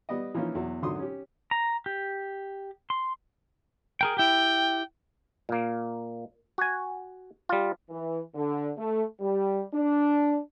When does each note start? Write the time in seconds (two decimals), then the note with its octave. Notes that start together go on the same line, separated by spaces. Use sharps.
0.09 G3 B3 D5 D#5
0.34 E3 F3 A#3 C#4 D#4 F4
0.55 E2 B2 F#3
0.82 G#1 D3 F#3 C6 D#6
0.99 C#4 G4
1.51 A#5
1.86 G4
2.90 C6
4.01 G#4 A#4 G5
4.17 E4 G4 G5
5.49 A#2 A#3
6.58 F#4 G#5
7.49 G3 F4
7.90 E3
8.35 D3
8.78 A3
9.21 G3
9.74 D4